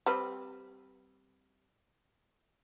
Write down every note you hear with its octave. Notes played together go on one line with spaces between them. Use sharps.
G3 C4 B4